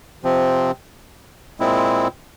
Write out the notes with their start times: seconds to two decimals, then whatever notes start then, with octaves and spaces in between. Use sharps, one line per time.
0.24 C3 F3 C4
1.59 A#2 G#3 C4 E4